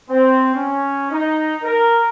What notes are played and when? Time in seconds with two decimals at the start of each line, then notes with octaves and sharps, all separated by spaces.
0.10 C4
0.54 C#4
1.12 D#4
1.64 A#4